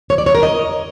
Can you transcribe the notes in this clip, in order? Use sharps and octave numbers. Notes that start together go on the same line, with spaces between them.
C#5
D5
C#5
A#4
D#5